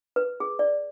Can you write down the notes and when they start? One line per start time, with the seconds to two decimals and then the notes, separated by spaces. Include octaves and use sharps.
0.16 B4
0.40 G#4
0.59 D5